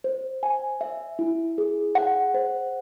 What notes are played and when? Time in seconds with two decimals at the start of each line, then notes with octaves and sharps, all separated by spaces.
0.04 C5
0.43 G#5
0.81 E5
1.19 E4
1.58 G#4
1.95 F#5
2.34 C5